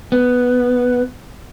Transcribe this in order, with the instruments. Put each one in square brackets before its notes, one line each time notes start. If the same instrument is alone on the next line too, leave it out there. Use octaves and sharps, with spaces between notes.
[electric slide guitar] B3